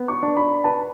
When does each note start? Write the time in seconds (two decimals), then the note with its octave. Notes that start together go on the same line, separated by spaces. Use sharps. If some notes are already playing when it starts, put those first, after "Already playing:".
Already playing: B3
0.08 C#6
0.23 D4
0.37 B5
0.64 B4 A5